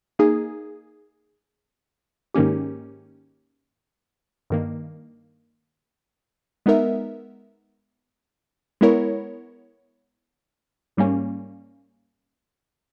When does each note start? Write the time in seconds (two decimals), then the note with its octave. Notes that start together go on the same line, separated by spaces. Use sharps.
0.19 A#3 D#4 G#4
2.34 G#2 D#3 A#3 C#4 G4
4.50 G2 D#3 A#3
6.66 G#3 B3 D#4 A#4 E5
8.81 G#3 B3 E4 A#4 C#5
10.97 G#2 G3 A#3 C#4